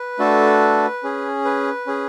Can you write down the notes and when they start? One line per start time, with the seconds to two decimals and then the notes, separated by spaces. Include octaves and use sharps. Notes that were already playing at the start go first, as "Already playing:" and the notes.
Already playing: B4
0.19 A3 D4 F#4 A4
1.03 C#4 G#4
1.45 B4
1.87 C#4 G#4